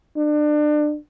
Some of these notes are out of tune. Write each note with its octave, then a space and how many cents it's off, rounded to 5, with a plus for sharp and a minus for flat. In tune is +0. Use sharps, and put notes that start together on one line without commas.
D4 +30